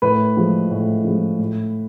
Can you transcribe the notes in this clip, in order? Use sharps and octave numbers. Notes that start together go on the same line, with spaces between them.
A2 B4
F3 G#3
A2
F3 G#3
A2